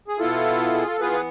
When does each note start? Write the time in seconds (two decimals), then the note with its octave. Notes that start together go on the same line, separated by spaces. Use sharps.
0.08 G#4
0.19 B2 B3 E4 F4 A4
0.74 G#4
0.87 A4
1.00 E3 B3 F4 G#4 B4
1.12 B4